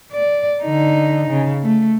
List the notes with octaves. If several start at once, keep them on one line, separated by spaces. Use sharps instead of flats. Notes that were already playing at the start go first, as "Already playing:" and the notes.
D5
D3 D#4
C#3
A3